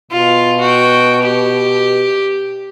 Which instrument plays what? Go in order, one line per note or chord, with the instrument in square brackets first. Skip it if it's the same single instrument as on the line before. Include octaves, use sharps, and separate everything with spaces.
[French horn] B2 [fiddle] F4
[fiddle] F#4 G5
G4